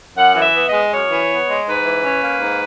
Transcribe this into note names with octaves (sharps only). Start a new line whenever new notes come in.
F#2 F#5
E3
E5
B3
D#5
G#3
F#2 C#5
E3
B3
G#3
G#2 B4
E3
C#4
A#3
G#2